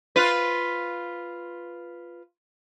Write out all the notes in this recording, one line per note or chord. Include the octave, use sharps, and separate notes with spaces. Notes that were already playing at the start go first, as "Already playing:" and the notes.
F4 B4